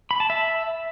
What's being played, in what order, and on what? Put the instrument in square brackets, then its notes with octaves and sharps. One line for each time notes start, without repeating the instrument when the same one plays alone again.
[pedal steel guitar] B5
A5
E5